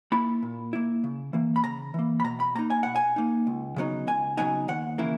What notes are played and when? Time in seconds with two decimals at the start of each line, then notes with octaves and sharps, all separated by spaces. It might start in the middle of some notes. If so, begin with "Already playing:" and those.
0.12 A#3 E4 B5
0.43 A#2
0.73 A#3 E4
1.04 C#3
1.33 E3 A#3
1.56 B5
1.64 C#3 A#5
1.94 E3 A#3
2.20 B5
2.24 B2 A#5
2.40 B5
2.55 A#3 D#4 A#5
2.70 G#5
2.83 B2 F#5
2.96 G#5
3.16 A#3 D#4
3.47 C#2
3.76 C#3 F#3 B3 D#4
4.07 C#2 G#5
4.37 C#3 F#3 B3 D#4 G#5
4.68 D#2 F#5
4.98 C#3 E3 A#3 E4